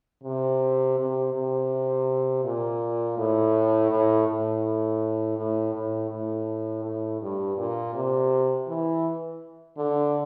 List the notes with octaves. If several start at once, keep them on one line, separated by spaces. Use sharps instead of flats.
C3
C3
C3
A#2
A2
A2
A2
A2
A2
A2
A2
G2
A#2
C3
E3
D3